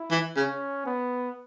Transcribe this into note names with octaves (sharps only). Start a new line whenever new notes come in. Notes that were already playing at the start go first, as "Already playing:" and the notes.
Already playing: E4
E3
C#3 C#4
B3